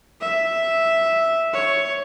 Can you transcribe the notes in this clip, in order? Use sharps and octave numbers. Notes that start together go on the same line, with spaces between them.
E5
C#5